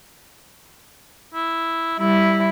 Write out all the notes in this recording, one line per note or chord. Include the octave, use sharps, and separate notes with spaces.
E4
G3 E4 E5